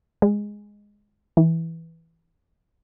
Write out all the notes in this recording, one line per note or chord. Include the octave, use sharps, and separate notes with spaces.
G#3
E3